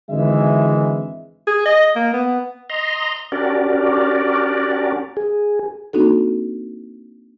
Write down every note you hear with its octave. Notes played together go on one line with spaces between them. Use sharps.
G#1 D3 E3 G#3 E5
G#4
D#5
A#3
B3
D#5 A#5 C6
C#4 D4 F#4 G4 A#4 D5
G#4
A#3 C4 D4 D#4 F#4 A4